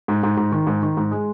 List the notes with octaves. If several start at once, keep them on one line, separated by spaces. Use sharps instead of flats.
G#2
G#2
G#2
D#3
G#2
D#3
G#2
G#3